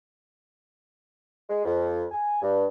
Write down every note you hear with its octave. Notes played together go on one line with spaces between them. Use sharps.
G#3
F2
G#5
G2